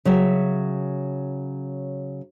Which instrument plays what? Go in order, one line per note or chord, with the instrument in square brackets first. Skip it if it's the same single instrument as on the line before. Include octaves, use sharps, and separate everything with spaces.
[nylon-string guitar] C#3 F#3 E5